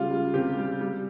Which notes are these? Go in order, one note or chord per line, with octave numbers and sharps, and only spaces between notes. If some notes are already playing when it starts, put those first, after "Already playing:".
Already playing: C#3 G3 G#3 F4
G3
C3 G4
G3
G3